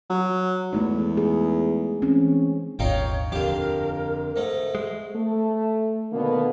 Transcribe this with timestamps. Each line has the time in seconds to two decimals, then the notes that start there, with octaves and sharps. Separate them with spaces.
0.10 F#3
0.73 E2 G#3 A3 D#4
1.17 G#4
2.02 E3 C4 C#4
2.79 D#1 G#1 D#4 F4 C#5 G5
3.32 F2 D3 F4 G4 A#4
4.36 G#2 A3
4.75 G#3
5.16 A3
6.12 B2 D3 D#3 A#3 B3